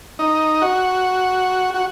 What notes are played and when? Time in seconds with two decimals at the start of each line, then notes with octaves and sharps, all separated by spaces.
0.19 D#4
0.62 F#4
1.74 F#4